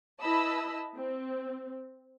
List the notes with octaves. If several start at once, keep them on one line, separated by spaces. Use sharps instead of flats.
E4 B4 D#5 A5 B5 E6
C4